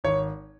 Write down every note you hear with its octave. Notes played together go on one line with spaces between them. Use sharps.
G#1 C#5